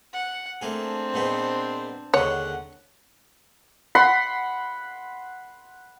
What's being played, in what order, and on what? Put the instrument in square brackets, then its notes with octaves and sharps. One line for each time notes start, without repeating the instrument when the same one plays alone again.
[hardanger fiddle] F#5
[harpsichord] A3 A#3 G#4 [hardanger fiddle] C4 D4
[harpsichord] A#2 G#3 B3 [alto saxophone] C5
[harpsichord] D#2 D3 G#3 [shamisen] C#5 [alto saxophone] F#5
[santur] F#5 B5 C6